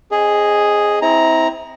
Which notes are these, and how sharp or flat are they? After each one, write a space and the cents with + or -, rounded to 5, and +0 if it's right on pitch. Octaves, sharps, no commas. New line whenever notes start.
C4 +30 G#4 +0 D#5 +0
C4 +0 E4 -30 A#5 +5